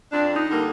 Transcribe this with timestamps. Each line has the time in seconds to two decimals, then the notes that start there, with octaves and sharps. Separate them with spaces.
0.12 F2 D4
0.36 D#4
0.48 D3 G3 A#3